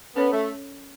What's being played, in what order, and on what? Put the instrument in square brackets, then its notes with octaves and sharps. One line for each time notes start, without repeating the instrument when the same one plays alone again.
[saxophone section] B3 [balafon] C#4 A4 C#5
[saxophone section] A3